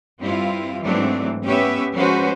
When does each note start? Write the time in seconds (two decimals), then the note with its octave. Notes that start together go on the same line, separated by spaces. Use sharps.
0.19 G2 C4 E4 F4
0.82 G#2 E3 F#3 A3 C4 D4
1.44 B3 C#4 G4 B4 C#5 E5
1.94 F3 G#3 C#4 F#4 B4 C5